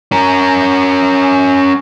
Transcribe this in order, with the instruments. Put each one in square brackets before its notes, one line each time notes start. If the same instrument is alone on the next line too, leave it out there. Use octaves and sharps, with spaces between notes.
[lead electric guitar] C#4 A#4